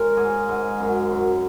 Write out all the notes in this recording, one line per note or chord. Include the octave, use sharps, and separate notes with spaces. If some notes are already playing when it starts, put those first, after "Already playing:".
Already playing: G#3 A#4 C#5
G#2 G#4
G#2
F#2
F#2